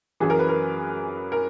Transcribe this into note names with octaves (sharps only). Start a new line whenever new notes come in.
F#2 E3 G#4
A#4
B4
A#4
A#4